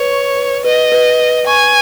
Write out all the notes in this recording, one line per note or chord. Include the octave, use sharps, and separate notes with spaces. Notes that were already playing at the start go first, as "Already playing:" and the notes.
Already playing: B4 C#5
C#6
B4
B4 D#5
B4
B4
G#5 C#6